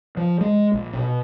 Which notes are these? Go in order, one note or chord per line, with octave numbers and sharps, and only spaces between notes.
F3
G#3
A#1
B2